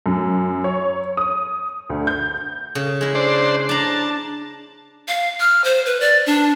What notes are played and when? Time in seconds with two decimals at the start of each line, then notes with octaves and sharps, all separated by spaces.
0.06 F#2
0.64 C#5
1.17 D#6
1.90 D2
2.07 G6
2.75 C#3
3.01 G#3 E4
3.15 D4 C5
3.69 D4 A5 A#5
5.08 F5
5.40 F6
5.64 C5
5.86 B4
6.00 D5
6.26 D4